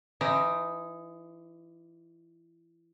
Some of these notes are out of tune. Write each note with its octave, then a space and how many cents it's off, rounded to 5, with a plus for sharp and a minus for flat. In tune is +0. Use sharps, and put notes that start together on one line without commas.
E3 +25 D#4 +0